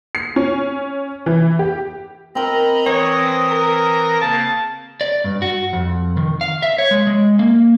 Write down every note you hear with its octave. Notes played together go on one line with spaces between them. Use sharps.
C7
C#4
E3
G4
C4 A#4 D#5 A#5 B5
E3 C#5 A#5 D#6 A#6
C4
A#4
C#3 A#3 A5
D5
G2
F#4
F2
D#3
F5
E5
C#5
G#3
G#3
A#3